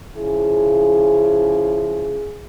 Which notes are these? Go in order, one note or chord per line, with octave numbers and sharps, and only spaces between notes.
C#3 F3 E4 G#4